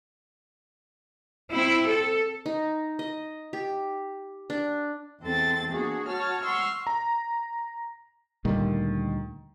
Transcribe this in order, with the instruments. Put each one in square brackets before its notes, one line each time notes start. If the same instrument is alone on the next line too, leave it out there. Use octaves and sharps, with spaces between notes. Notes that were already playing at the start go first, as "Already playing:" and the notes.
[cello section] C4 E4
A4
[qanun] D#4
D#5
G4
D4
[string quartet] E2 C4 A4 A6
A#3 B3 D4 F#4 G#4
F#4 C#5 A5 F6
F#5 C6 C#6 E6 F6
[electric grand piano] A#5
[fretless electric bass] D2 A#2 G3 [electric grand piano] D#3